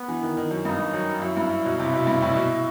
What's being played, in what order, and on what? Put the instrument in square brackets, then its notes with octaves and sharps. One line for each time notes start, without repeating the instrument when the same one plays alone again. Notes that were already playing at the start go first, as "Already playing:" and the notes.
Already playing: [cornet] B3
[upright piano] E3
D#3
D#3
F#2
[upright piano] G2 [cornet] D#4
[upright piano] G2
F#2
[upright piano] F#2 [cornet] E4
[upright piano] G2
B2
[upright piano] C3 [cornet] E4
[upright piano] B2
G2
A2
B2